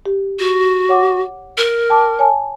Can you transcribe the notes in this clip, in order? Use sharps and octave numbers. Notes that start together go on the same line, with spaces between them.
G4
F#4
C#5 F#5 D6
A#4
G5 A5 D6
C#5 G#5 A5